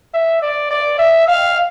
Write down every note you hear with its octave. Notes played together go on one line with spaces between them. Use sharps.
E5
D5
D5
E5
F5